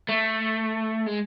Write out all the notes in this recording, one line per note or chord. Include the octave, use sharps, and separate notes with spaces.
A3
G#3